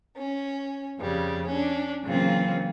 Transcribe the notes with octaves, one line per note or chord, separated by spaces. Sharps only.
C#4
F2 C#3 G3
C#4 D4
C#3 E3 F#3 A#3 C4 F4